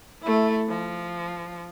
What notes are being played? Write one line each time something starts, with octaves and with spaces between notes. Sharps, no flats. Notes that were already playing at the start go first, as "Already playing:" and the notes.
A3 E4
F3